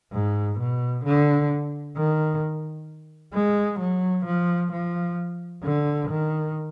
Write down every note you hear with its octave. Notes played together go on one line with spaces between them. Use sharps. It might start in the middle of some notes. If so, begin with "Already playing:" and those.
G#2
B2
D3
D#3
G#3
F#3
F3
F3
D3
D#3